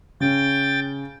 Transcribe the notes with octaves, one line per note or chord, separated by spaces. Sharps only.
C#3 C#4 G5 A6